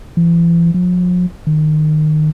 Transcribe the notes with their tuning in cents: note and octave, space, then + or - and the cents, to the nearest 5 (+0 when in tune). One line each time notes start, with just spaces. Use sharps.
E3 +40
F3 +45
D#3 -20